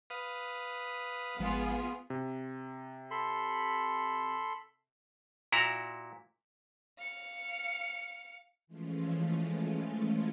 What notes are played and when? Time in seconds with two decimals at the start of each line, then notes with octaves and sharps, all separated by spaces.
0.10 B4 F5 D#6
1.40 G#1 F3 G#3 B3 F4 G#4
2.10 C3
3.11 A4 B5 C6
5.52 A#2 E4 F#4 A#5
6.99 F5 C#7
8.67 E3 F3 G#3 A3 C#4 F4